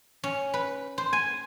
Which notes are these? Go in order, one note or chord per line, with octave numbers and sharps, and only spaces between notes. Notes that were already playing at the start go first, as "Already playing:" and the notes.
C#4
B4
C5
G#5